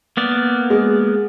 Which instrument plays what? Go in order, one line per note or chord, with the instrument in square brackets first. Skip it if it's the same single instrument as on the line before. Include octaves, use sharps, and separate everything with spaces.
[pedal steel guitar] A#3 B3 D5
[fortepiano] G#3